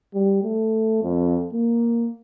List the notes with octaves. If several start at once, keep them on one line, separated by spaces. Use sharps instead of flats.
G3
A3
F2
A#3